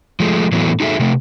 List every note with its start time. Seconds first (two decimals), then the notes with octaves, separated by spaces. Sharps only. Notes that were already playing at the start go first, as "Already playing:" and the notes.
0.20 F3 G#3 A3
0.52 A2 E3 F#3 A3 B3
0.80 D#4 F#4 G#4 A4 E5
0.99 C3 A3